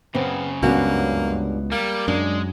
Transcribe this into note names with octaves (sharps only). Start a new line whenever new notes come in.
F#2 C#3 B3 C4
C#2 G2 A#3 B3 C#4 F#4
G3 A#3
F#2 G#3 D4